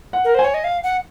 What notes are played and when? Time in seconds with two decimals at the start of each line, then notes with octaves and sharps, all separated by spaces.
0.13 F#5
0.24 A#4
0.35 C5 G#5
0.44 C#5
0.54 D#5
0.64 F5
0.83 F#5